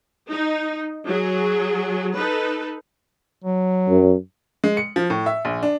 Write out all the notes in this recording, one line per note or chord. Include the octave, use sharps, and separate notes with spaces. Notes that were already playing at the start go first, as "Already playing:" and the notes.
D#4
F#3 G#4
D#4 A4 B4
F#3
F#2
G#3
C#7
F3
A2
E5
A#1
D4